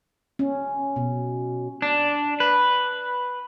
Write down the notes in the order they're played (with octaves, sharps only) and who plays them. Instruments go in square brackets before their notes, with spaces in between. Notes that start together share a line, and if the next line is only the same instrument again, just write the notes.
[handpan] C#4
B2
[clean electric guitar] D4
B4